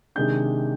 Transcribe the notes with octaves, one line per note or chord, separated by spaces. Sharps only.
C3 D#3 G#3 D4 G6